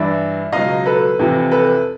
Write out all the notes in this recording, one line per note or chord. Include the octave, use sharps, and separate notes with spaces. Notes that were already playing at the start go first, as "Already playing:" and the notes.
Already playing: G2 E3 D5 E5
C#2 B2 F#3 D#5 F5
A4 B4
F2 C3 E3
A4 B4